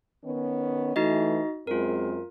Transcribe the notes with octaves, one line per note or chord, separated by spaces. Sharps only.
D#3 B3 C#4
E3 A3 D#4 F#4 D#5
F#2 G#3 C4 F4 A#4